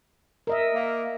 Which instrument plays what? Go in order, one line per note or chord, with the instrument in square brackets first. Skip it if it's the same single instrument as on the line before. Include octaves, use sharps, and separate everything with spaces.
[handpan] A#4 D#5 E5
[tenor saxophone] A#3